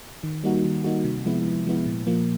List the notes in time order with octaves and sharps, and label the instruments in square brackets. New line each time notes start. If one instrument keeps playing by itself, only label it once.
[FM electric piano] D#3
G3 A#3 D#4 F#4
D#3
G3 A#3 D#4 F#4
C3
F3 G#3 B3 E4
C3
F3 G#3 B3 E4
A#2
F3 A#3